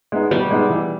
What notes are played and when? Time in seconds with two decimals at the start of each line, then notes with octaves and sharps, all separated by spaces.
0.12 G#3 B3 D#4
0.31 B2 G3
0.51 G#3 B3 D#4
0.70 E3